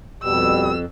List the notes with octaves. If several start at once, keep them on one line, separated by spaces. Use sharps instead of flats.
F2 B2 G3 E6